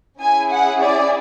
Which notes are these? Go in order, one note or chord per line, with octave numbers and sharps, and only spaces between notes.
C#4 E4 G#4 G#5
F#5
D5